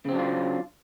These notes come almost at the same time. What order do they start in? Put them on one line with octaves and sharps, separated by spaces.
C#3 C4 F#3 D4 F4